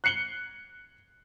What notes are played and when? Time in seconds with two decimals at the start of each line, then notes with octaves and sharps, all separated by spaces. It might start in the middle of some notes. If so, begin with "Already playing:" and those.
0.04 F#6 C7 C#7 F#7 G7